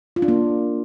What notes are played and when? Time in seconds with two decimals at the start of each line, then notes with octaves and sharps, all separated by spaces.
0.16 F4
0.22 D4
0.28 A#3